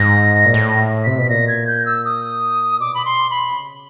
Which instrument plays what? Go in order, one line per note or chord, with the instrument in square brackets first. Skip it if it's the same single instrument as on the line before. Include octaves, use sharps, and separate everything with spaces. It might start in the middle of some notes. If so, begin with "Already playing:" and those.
Already playing: [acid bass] G#2 [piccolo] A#6
[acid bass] A#2
[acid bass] A2 [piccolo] A#6
[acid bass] C3 [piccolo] B6
[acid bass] B2
[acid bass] A#2 [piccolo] A#6
[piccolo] G#6
G6
E6
D#6
[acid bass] B2 [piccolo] D6
[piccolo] B5
C6
B5
[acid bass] C3
C#3